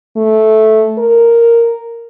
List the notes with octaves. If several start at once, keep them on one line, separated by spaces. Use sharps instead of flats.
A3
A#4